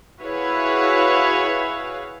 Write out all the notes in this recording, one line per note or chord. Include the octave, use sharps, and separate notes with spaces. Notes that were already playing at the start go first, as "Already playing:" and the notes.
E4 F#4 G#4 B4 C#5 F5